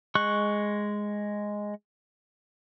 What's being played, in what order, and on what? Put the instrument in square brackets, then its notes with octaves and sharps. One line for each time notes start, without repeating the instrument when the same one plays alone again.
[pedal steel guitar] G#3 C#6 F#6